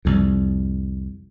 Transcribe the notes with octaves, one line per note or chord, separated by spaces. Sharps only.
C2 F2